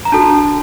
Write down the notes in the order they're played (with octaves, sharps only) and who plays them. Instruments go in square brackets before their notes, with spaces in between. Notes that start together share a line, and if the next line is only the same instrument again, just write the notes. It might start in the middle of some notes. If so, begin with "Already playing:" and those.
[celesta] A#5
D4 F#4 A4 A5